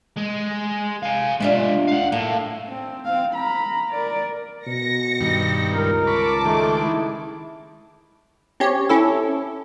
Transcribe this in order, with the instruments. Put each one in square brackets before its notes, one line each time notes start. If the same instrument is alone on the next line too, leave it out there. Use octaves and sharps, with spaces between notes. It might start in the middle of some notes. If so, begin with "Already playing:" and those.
[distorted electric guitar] G#3
F5 G#5
[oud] C3 D4 F4 [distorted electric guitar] G#3 E5
[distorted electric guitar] F5 F#5
[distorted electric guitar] A2 [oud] A#3
[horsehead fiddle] C4
C4 F5
A#5 B5
A#4 D5
[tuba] B2 [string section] A#6 C#7
[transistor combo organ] G2 D#3
[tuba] C#2 [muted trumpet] A#4
[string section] A5 D6 [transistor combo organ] B5 C#6
[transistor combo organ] D#3 G#3 [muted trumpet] A3
[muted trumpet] E4
[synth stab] C4 C#4 G4 C#5
C#4 E4 A4